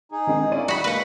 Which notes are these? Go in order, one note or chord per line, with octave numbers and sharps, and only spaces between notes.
D#4 G#4
D#3 G#3 C4
A#2 C#4 E4 D5 D#7
G3 F#4 F5 B5
G#3 A#3 B4 F#5